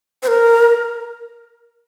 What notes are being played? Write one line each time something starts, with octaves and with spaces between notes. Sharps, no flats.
C5
A#4